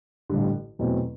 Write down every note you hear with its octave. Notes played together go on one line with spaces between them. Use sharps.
A1 G2 D3
E2 B2 F#3 A3 C4